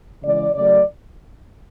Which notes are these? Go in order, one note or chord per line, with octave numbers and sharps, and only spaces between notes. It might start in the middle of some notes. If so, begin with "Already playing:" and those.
C#3 E3 G#3 D5
C#3 F#3 A3 D5